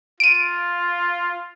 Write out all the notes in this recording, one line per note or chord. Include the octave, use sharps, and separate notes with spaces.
F4 D7 D#7